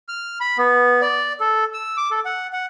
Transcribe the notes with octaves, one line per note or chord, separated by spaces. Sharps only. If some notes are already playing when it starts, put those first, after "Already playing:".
F6
B5
B3
D5
A4
E6
D6
A4
F#5
F#5